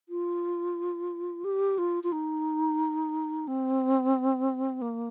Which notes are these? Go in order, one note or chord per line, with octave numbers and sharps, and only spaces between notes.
F4
G4
F4
F4
D#4
C4
A#3